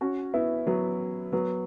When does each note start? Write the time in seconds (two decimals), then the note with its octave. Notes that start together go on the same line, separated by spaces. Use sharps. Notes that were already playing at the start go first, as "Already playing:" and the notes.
0.01 C#4 F#4
0.34 B3 E4
0.67 F#3 B3
1.33 F#3 B3